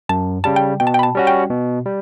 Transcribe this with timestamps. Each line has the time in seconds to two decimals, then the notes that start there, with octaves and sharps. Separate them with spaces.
0.09 F#2 A5
0.44 C#3 G3 A5
0.56 G5
0.80 B2 G5
0.87 A5
0.94 G5
0.99 B5
1.03 A5
1.15 G3 C#4 F#4
1.27 G5
1.50 B2
1.86 G3